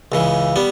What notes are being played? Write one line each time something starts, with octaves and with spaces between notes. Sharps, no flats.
C#2 C#3 E3
G3 B3